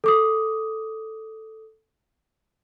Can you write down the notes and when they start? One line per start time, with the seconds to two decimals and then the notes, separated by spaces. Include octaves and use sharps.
0.04 A4 D6 D#6